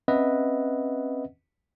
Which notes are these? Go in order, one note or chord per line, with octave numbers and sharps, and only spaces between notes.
C4 C#4 B4 D#5 E5 F#5